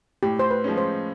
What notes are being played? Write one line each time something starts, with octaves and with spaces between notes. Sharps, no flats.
A2 G4
C5
B4
F3 G#3 C#4
C5